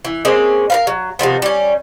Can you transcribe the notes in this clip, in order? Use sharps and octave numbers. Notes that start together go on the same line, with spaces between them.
E3
G#3 A#3 C4 C#4
A#4 B4 F5
F#3
C3 D#3 F3 B3
G3 C#4